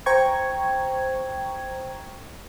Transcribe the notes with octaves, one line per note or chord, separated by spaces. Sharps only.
C5 G5 A#5 C#6 G#6